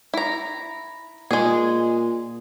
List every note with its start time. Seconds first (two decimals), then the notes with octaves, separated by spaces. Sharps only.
0.14 E4 A#5
1.31 A#2 G#3 G#4